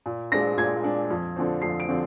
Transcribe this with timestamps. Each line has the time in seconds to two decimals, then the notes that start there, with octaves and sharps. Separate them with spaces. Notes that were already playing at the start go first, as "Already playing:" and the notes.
0.06 A#2
0.32 G#3 D4 A#6
0.58 A#2 G#6
0.84 G#3 D4
1.10 F2
1.36 D3 F3 C4
1.62 F2 C7
1.80 D7
1.88 D3 F3 C4